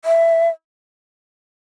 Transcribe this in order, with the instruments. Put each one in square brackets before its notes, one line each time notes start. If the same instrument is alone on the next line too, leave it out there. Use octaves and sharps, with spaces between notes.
[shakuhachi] E5